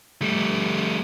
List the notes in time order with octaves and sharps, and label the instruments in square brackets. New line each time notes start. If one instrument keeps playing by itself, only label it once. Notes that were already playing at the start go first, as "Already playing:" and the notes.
[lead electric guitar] G3 A3